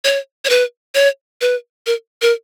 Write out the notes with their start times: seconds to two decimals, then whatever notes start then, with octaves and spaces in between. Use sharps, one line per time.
0.04 C#5
0.45 C#5
0.50 B4
0.95 C#5
1.41 B4
1.86 A#4
2.22 A#4